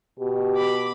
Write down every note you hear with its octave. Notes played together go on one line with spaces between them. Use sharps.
B2 G4
B5 D6